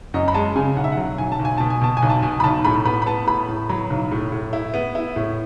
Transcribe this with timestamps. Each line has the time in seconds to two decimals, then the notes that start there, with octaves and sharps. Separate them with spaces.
0.14 F#2 D#5
0.28 B5
0.34 G#3 A5
0.56 C#3 G#5
0.76 B1 F#5
0.84 E5
0.92 F#5
0.98 F#3
1.18 B1 G#5
1.32 A5
1.39 B1
1.45 G#5
1.58 B2 A5
1.70 G#5
1.81 B2 A5
1.97 G#5
2.02 B1
2.09 A5
2.22 B2 G#5
2.40 B5
2.44 B1 A5
2.65 A2 B5
2.85 B3 B5
3.02 B5
3.06 B3 A5
3.27 A2 B5
3.48 A2
3.69 F#3 B5
3.90 B1
4.11 A2
4.32 A2
4.53 E4
4.74 B3
4.95 E4
5.16 A2